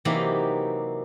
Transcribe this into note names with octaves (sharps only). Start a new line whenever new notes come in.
C3 E3 F#3 A#3 D#4 G4